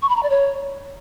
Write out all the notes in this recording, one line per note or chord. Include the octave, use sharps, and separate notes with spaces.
C#6
B5
A#5
D5
C#5